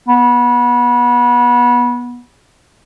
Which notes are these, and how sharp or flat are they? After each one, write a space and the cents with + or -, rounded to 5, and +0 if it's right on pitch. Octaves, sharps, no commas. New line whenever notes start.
B3 -25